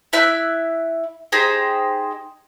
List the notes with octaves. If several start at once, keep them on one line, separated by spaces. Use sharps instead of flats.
E4 E5 F#6 G6
D#4 G4 G#4 C5